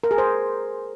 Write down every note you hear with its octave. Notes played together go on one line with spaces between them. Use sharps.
A#4
G#4
C5